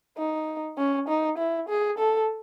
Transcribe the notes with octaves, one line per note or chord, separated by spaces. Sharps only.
D#4
C#4
D#4
E4
G#4
A4